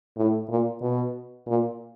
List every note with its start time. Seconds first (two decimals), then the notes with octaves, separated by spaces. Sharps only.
0.17 A2
0.49 A#2
0.81 B2
1.47 A#2